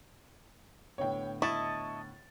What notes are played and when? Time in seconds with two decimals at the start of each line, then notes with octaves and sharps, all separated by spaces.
0.98 A2 D3 B3 C#5 G5
1.42 E4 D#5 A5 C#6 A6